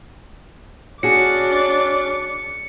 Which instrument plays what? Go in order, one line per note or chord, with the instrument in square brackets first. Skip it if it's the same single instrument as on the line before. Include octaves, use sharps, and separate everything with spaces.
[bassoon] C#4 [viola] D4 D6 [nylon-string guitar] F#4 G#4 [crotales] C#7